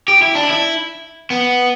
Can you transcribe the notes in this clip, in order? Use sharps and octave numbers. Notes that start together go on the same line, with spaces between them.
G4
E4
D4
E4
B3